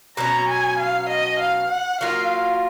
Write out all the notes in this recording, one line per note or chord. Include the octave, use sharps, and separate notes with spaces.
B2 F#3 C#4 A#5
G#5
F5
D#5
F5
F#5
F#3 A#3 F4 F5